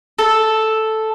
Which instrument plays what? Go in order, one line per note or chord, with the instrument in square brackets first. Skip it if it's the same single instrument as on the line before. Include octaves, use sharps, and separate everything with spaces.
[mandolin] A4